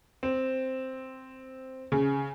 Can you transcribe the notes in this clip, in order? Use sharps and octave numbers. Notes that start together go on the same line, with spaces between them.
C4
C#3